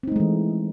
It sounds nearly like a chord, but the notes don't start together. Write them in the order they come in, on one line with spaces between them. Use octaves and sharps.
C4 D#4 A3 G#3 E3